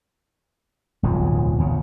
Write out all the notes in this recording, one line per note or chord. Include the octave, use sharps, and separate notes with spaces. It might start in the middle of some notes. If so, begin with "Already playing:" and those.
D1 B1 E2 F3
E2 A#2 C#3